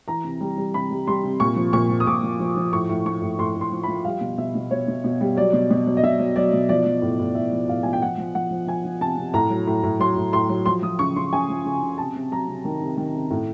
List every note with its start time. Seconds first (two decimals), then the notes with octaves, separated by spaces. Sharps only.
0.08 E3 A#5
0.24 C3
0.41 G3
0.57 G3
0.74 C3 B5
0.90 G3
1.07 G3 C6
1.23 C3
1.40 A#2 C#6
1.56 F3
1.73 A#2 C#6
1.89 F3
2.00 D#6
2.07 A#2 D6
2.23 F3
2.39 F3
2.57 F3
2.73 A2 C#6
2.89 A2
3.05 F3 C#6
3.22 A2
3.39 A2 C6
3.55 A2
3.61 C6
3.72 F3
3.83 B5
3.88 F3
4.05 G3 F5
4.21 B2
4.38 B2 E5
4.55 B2
4.71 B2 C#5
4.88 B2
5.04 B2
5.21 G3
5.37 F#3 D5
5.53 B2
5.71 B2
5.87 F#3
5.97 D#5
6.03 B2 E5
6.19 F#3
6.36 F#3 D5
6.53 B2
6.69 F3 D5
6.86 F3
7.02 A2
7.20 A2
7.35 A2 E5
7.52 F3
7.68 A2 F5
7.83 F3 G#5
7.93 G5
8.02 F3 F#5
8.18 F3
8.35 F3 F#5
8.51 F3
8.67 F3 G#5
8.85 F3
9.01 C3 A5
9.17 C3
9.34 A2 A#5
9.50 F#3
9.67 A2
9.83 A2
10.00 F#3 C6
10.16 A2
10.33 A2 C6
10.49 F#3
10.66 F3 C6
10.82 F3 D#6
10.99 C#3 C#6
11.16 C#3 C6
11.32 C#3 G#5
11.49 F3
11.65 C#3
11.83 C#3
11.98 C3 A5
12.15 C3
12.31 F#3 A#5
12.48 C3
12.65 D#3
12.81 C3
12.97 D#3
13.14 C3
13.31 A2